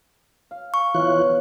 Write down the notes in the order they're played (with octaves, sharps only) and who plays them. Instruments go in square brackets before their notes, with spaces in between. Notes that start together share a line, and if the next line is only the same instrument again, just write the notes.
[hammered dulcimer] F5
[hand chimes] C#6
[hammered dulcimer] B2 C#5 [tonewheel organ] E3 F4 F#6